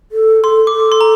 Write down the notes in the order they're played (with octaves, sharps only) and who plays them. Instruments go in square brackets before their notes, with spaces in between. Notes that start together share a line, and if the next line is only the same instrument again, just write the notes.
[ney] A4
[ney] A4 [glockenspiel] C6
[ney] A4 [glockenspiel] D6
[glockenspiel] C6
A#5